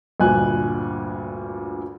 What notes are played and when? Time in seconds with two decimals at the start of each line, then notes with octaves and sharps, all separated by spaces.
0.20 D2 G2 A#2 G#5 F#6